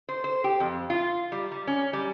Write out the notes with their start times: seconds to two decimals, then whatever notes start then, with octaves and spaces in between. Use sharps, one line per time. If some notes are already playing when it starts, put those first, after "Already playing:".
0.09 C5
0.24 C5
0.44 G4
0.60 F2
0.90 F4
1.32 G3
1.52 G3
1.67 C#4
1.93 G3